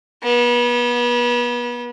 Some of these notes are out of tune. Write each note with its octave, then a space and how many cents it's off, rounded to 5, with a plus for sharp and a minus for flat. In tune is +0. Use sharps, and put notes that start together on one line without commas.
B3 -35